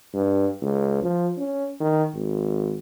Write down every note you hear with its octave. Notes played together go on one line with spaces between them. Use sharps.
G2
C#2
F3
C#4
D#3
G#1